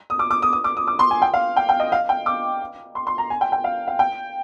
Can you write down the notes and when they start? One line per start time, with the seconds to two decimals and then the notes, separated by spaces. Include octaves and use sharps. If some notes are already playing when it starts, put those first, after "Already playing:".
0.10 D#6
0.19 D6
0.31 D6
0.42 D#6
0.53 D#6
0.64 D6
0.77 D#6
0.87 D6
0.99 C6
1.11 G#5
1.22 G5
1.34 F5
1.57 G5
1.69 G5
1.80 D#5
1.92 F5
2.09 G5
2.26 D6
2.95 C6
3.07 C6
3.18 A#5
3.30 G#5
3.41 G5
3.52 G5
3.64 F5
3.87 F5
3.99 G5